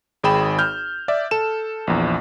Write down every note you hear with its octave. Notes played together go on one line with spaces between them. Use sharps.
G#1 G#4 G5 B5 E7
F6 G6
D5 E5
A4 E7
A#1 E2